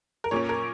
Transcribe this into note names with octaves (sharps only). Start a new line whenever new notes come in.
A#4
A#2 A#3 C#4 C#5
A#4